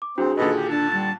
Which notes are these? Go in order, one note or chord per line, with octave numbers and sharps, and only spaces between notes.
D6
C2 C4 D4 F#4 G#4
D#2 A#2 D3 A4 B4 D#5
G4
D4 A5
G3 A6